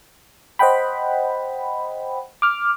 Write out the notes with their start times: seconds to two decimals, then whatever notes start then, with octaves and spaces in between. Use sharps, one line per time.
0.59 C5 D#5 F#5 G5 B5
2.42 D6 F6